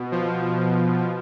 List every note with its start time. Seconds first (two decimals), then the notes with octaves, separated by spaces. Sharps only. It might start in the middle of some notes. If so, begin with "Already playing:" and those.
Already playing: B2
0.12 F3